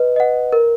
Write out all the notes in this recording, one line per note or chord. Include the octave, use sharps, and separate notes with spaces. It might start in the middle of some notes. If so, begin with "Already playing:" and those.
Already playing: B4 D#5
D#5 F#5
A#4